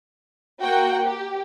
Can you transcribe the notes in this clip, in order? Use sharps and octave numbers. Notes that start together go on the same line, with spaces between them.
A#3 F#4 F#5 G5
G4